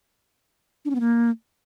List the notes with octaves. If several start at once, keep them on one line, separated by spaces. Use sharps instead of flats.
D4
C#4
B3
A#3